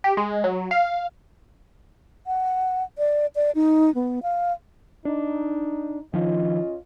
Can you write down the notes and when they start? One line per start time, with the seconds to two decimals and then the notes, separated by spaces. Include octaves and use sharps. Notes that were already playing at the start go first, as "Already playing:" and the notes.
0.04 G4
0.17 G#3
0.44 F#3
0.71 F5
2.27 F#5
2.98 D5
3.36 D5
3.55 D#4
3.95 B3
4.23 F5
5.05 D4 D#4
6.14 D#3 F3 C#4 F4 D#5